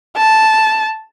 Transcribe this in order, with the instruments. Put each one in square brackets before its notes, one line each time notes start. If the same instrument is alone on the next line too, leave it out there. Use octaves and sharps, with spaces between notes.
[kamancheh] A5